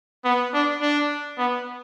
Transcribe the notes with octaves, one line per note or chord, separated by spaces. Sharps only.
B3
D4
D4
B3